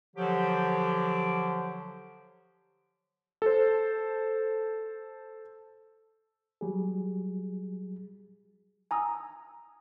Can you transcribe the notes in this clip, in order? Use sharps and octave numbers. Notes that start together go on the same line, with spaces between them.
D3 F3 F#3 G4
A4 C5
F#3 G3 G#4
G#5 A#5 D#6 E6